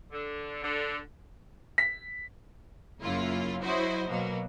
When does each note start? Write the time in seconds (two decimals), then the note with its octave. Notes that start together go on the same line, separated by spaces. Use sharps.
0.12 D3
0.62 D3
1.78 B6
3.01 F#2 C#3 A#3 E4 F4
3.62 F#3 E4 F#4 C5 D#5
4.08 B2 F#3 A#3